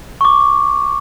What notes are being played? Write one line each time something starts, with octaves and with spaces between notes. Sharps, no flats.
C#6 D6